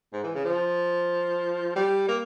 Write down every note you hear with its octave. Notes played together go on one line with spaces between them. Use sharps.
G#2
E3
C#3
F3
G3
A#3